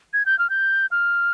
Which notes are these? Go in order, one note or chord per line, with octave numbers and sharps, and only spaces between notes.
G#6
G6
F6
G6
F6